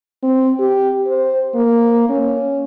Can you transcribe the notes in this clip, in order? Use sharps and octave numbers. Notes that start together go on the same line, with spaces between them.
C4
G4
C5
A#3
C#4